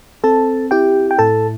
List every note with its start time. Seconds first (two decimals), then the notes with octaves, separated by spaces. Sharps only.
0.24 C4 A4 A5
0.71 E4 G4 G5
1.11 G5
1.19 A2 A4 A5